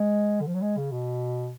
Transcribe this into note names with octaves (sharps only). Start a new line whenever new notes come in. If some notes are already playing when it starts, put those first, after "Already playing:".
Already playing: G#3
D3
F3
F#3
G#3
C#3
B2